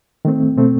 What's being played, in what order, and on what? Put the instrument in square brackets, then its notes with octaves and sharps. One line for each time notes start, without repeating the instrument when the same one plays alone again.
[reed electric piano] D#3 A3 C4
B2 A3 C4